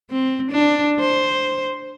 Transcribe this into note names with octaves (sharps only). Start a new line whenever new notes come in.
C4
D4
C5